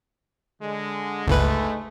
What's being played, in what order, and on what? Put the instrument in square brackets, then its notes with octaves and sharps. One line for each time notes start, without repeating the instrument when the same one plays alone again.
[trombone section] D3 G#3
[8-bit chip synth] G1 C#2 B4 [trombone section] G#2 G#3 A3